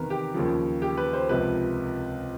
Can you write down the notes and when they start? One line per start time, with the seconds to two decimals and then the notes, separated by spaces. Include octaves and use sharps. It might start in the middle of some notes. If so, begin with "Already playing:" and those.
Already playing: E2 C3 D#3 A#4 B4
0.10 G4
0.34 D#2 C#3 F3
0.82 G4
0.97 B4
1.13 C5
1.29 C#2 C3 F3 B4